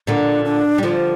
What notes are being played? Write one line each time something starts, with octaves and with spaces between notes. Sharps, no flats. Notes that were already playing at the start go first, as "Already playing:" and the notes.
A#2 D3 D4
D4
G3
D3 F3 F4